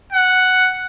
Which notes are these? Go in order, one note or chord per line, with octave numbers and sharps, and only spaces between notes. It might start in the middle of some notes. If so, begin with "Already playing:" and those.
F#5